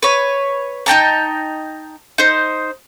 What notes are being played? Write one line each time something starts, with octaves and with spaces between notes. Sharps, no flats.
B4 C#5
D#4 G5 A5 A#5
D#4 C5